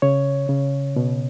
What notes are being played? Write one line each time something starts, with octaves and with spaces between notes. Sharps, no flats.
C#3 C#5
C#3
B2